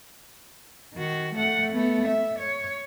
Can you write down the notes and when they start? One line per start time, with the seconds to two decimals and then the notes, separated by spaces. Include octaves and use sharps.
0.94 D#3 F#4
1.34 A3 F#5
1.73 A3 B3
2.08 E5
2.39 C#5